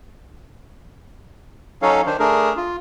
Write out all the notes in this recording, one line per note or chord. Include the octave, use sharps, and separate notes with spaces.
F#3 C#4 D#4 A4 C#5 F5
D#3 D4 C5
A3 D4 G#4 A#4
F4